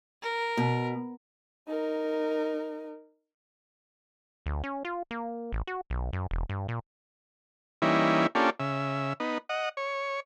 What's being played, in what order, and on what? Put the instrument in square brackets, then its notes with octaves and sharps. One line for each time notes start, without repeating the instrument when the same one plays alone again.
[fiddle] A#4
[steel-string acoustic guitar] B2
[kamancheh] D#4 A#4
[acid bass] D2
C#4
F4
A#3
A1
F#4
B1
F#2
E1
G2
A#2
[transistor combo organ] E3 G3 A#3 C#4 D#4 E4
A#3 C#4 D4 F4 G4 A4
C#3 E5
B3 D#4
D#5 F#5
C#5